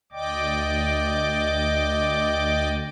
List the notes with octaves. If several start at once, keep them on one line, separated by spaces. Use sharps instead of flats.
D2 D5 D#5 G5 D6